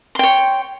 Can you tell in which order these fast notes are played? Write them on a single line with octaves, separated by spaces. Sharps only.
C6 G5 C#5